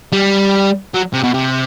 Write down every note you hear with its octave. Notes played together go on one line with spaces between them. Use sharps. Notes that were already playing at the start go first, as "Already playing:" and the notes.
G3
F#3
C3
B2
C3